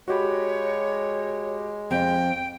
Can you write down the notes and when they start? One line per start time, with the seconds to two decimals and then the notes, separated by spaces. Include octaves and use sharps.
0.08 G#3 F#4 G4 C#5 B5
1.91 F2 G5